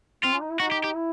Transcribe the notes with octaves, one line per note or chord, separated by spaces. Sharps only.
C4 F4
C#4
D#4
E4
D#4 F#4
G4
G4
E4